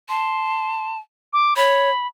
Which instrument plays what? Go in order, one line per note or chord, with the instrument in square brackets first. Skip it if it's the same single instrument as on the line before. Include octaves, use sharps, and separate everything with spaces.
[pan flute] A5 [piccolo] C6
[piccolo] D6
[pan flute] C#5 [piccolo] B5